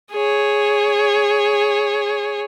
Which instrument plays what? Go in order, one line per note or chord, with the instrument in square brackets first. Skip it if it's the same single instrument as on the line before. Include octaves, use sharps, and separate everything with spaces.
[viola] G#4 C#5